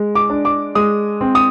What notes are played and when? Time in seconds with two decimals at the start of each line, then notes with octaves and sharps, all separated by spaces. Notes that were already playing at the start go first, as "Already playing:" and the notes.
Already playing: G#3
0.15 D6
0.30 D4
0.45 D6
0.75 G#3 D#6
1.21 C4
1.35 D#6